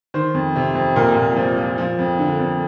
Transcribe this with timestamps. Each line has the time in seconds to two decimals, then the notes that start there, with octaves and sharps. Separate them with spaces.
0.14 D#3 C5
0.34 F2
0.56 C3
0.75 F2
0.96 A#2 A#4
1.16 A#2
1.37 F3
1.58 F3
1.78 F3
1.99 F2
2.19 D3
2.39 F2